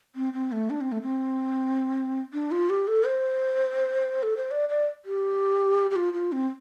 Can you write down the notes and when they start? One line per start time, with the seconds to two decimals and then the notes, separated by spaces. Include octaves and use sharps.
0.16 C4
0.33 C4
0.52 A3
0.70 D4
0.81 C4
0.92 A3
1.02 C4
2.33 D4
2.51 F4
2.70 G4
2.88 A4
3.06 C5
4.23 A4
4.37 C5
4.51 D5
4.69 D5
5.05 G4
5.91 G4
5.96 F4
6.14 F4
6.32 C4